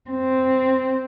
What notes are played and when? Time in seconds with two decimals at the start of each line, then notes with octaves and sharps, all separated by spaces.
0.11 C4